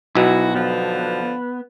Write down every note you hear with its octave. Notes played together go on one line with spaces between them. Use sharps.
B1 B2 F3 E4 F#4
D3 F3 B3